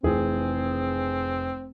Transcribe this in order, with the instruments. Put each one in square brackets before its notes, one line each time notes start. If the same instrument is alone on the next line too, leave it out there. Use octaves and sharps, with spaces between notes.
[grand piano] F1 E3 G#4 [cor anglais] C4